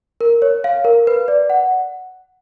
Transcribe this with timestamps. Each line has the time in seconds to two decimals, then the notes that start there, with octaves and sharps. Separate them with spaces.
0.21 A#4
0.42 C#5
0.64 F5
0.85 A#4
1.07 B4
1.28 D5
1.50 F#5